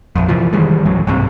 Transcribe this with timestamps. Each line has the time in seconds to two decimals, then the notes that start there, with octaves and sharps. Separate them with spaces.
0.16 A#1 F2
0.28 C3 E3 F3
0.53 D#3 E3 G3 G#3
0.85 D1 A#1 F#2 F#3
1.07 B1 G2 C3